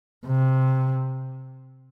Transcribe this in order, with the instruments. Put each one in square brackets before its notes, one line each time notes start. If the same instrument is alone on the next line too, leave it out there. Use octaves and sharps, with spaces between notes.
[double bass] C3